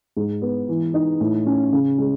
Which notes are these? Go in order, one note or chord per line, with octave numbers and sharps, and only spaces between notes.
G#2
B3
E3
D#4
A2
C#4
C#3
G#3